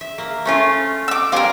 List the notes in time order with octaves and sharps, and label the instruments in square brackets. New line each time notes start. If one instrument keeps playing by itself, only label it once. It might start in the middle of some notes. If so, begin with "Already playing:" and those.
[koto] E5
A#3
A3 C#4 F4
[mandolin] D6 E6
[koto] G3 C4 G#5 [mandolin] F4 A#4